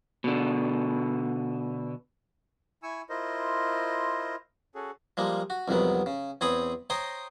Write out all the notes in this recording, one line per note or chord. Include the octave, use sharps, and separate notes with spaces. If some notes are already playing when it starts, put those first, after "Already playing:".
B2 D3
E4 G#5 C#6 E6
E4 F4 A#4 C5 D#5
C#4 F#4 G#4 A4
F3 G3 G#3 A#3
F#4
C2 F2 D#3 F#3 B3
C#3
E2 C4 G#4 C#5 B5 D#6
C5 C#5 D#5 G5 A#5 C6